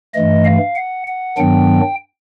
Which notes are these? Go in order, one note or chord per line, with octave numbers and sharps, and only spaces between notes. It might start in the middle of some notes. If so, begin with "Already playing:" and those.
G2 E3 A3 D#5
F5
F#5
F#5
G2 D#3 F#3 B3 D4 G5